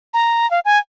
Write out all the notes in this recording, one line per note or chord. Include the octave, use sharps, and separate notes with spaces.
A#5
F5
G#5